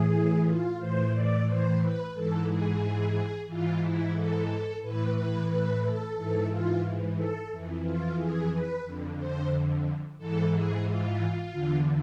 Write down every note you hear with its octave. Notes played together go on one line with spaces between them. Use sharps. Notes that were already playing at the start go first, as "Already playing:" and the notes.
Already playing: A2 E3 G#4
F4
A2 E3 C5
D5
C5
B4
G#2 E3 A4
G#4
G#2 E3 F4
E4
A4
A2 E3 B4
B4
B4
A4
G#2 E3 A4
F4
A4
F2 E3
F4
G#4
B4
F2 D3
C5
G#2 E3 A4
G#4
F4
E2 D3